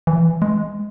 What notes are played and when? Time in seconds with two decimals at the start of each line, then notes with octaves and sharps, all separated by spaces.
0.07 E3
0.42 G#3